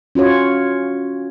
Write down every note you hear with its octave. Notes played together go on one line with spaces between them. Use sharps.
C#4 F4 F#4 C#5